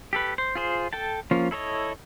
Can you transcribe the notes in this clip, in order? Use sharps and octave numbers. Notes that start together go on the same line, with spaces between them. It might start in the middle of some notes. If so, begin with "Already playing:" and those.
G4 A4 B4
C5
F4 G#4 C5
A4 G5 A5
F3 A#3 C#4 F4
E4 A4 C#5 D#5